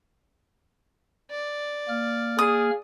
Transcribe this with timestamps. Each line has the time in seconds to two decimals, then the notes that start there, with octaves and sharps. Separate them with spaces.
1.31 D5
1.89 A#3 F6
2.39 G#4 D#6